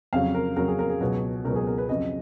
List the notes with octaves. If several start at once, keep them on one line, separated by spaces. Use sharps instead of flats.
F2 C#3 F#3 F5
A#4
F2 C#3 F#3 A#4
G#4
A#4
G#4
C#2 B2 F#3
C#2 B2 F#3 A#4
G#4
A#4
B4
F2 C#3 F#3 D#5